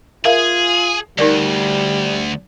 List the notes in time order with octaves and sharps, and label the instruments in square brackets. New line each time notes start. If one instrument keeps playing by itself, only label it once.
[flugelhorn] F4 [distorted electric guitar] G#4 [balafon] A#4 E5 F5
[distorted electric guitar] D2 [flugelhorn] G3 [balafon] D#4 A#4 D5